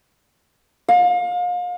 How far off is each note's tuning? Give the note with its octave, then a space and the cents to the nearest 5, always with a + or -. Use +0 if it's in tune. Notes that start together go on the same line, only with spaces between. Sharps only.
F5 +35